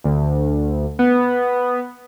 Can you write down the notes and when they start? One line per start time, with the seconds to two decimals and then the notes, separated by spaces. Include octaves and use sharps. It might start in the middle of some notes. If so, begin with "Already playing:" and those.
0.04 D2
0.99 B3